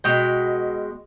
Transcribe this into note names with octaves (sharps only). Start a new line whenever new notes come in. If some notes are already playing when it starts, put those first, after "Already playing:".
B2 G#3 G5